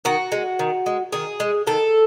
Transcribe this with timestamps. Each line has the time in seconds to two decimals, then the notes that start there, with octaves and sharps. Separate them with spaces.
0.05 D#3 F#4
0.32 G#3
0.59 D#3
0.86 G#3
1.12 D#3 G#4
1.40 G#3
1.67 D#3 A4